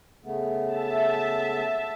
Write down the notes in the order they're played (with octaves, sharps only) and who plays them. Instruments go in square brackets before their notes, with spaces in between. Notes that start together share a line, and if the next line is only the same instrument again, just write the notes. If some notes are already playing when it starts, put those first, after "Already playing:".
[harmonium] C#3 A3 B3
[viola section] E5 A5